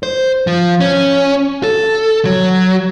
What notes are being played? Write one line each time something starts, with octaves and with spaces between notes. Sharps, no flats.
C5
F3
C#4
A4
F#3